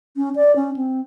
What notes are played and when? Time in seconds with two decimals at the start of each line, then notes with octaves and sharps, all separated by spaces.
0.17 C#4
0.36 D5
0.56 C#4
0.76 C4